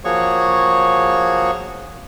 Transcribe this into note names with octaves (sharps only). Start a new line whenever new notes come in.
F3 A#3 F#4 G#4 C#5 C#6